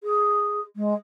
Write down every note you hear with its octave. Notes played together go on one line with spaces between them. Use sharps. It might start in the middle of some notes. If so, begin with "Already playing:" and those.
G#4
G#3